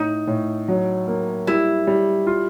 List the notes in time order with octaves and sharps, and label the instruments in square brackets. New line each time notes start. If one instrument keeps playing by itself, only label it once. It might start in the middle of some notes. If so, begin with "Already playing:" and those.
Already playing: [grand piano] A2 [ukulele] D#4
[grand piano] A2
F#3
A#3
[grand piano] G3 [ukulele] E4
[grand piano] G3
F4